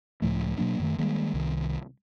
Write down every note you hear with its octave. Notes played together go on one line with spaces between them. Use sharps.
C#2 A2 F3 A3
B2 F#3 A#3 D4
F#2 D#3 A3
D#3 G3 G#3 A#3
C2 D#3